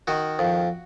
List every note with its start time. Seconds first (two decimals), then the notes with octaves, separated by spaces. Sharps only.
0.07 D#3 F#4
0.39 F2